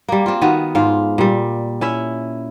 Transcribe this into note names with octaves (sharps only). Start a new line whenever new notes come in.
G3 A#3
C4 F4
D#3 B3 F#4
G#2 F4 F5
A#2 G3
C#4 E4 E5